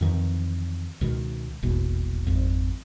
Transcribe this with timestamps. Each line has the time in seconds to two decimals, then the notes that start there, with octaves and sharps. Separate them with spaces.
0.01 F2 D#3 E3
1.01 C#2 B2 D#3
1.63 D#1 G#1 E2 B2
2.27 G#1 F2